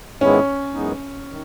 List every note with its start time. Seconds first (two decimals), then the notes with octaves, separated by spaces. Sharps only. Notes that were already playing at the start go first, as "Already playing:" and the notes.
0.20 G#2 D#3 G#3 B3 C#4 E4
0.73 F#2 E3 G#3 B3 D#4
1.28 D#3